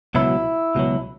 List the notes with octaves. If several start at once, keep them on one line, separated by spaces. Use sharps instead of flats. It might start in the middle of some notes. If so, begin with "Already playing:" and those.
C#2 B2 F#3 E4
C#2 B2 F#3